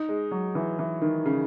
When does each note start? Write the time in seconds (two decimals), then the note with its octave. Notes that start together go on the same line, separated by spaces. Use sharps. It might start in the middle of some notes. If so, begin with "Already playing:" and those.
Already playing: D#4
0.09 G#3
0.31 F#3
0.55 E3
0.79 E3
1.02 D#3
1.26 C#3